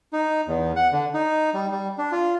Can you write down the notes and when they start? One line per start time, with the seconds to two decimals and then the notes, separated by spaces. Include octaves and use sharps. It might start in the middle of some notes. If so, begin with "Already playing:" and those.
0.13 D#4
0.48 E2
0.76 F#5
0.92 D3
1.14 D#4
1.54 G3
1.71 G3
1.98 D4
2.12 F4